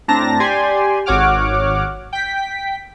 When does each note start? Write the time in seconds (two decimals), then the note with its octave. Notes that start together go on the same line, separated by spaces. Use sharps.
0.08 A2 C4 D4 A5 A#5 A#6
0.40 G4 D5 G#5 C6
1.06 G#1 F#4 C#5 F#5 D6 F6
2.13 G5 B6